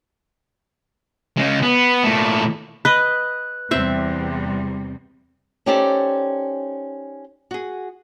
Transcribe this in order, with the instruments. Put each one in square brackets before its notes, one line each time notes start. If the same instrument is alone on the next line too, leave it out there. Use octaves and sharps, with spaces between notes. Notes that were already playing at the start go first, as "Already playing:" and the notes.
[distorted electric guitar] C#3 G#3
B3
A#2 A3
[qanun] B4 D#5 [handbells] F#6
[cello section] E2 C3 G3 [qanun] C4 E5
[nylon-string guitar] C#4 D#4 G4 A4 C5 D5
F#4 G#4